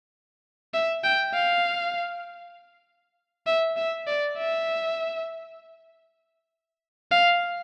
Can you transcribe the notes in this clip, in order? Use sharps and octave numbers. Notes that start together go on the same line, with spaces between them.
E5
G5
F5
E5
E5
D5
E5
F5